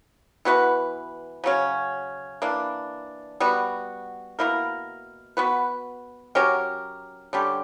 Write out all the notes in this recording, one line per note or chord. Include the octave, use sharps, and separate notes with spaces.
E3 B3 F#4 B4
C#3 F#3 C#4
E3 A#3 D4
G3 B3 F#4
B2 A#3 E4 A#4
B3 F#4 B4
F#3 C#4 G4 A#4
D3 G3 C#4 G4